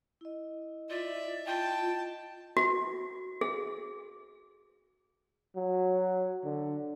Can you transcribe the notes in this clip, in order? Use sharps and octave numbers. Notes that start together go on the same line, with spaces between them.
E4 D#5
F4 D5 E5
F4 G5 A5
F#4
G#4
F#3
D3